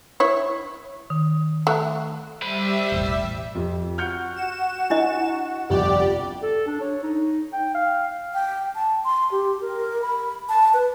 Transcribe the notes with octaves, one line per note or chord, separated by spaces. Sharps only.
E4 C#5
D#3
A3 F#5 A#5 F#6
G3 C5 E5 B5
E1 A1
F2 G4
F#4 F6 G6 C#7
E7
D4 E4 D#5
G1 C2 F2 G4 D5
A4
D4
C#5
D#4
G5
F5
G5
A5
C6
G4
A#4
B5
A5
B4